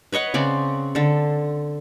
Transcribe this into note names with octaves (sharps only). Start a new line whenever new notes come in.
B4 C#5 D#5 F#5
C#3 C4 D5
D3 A4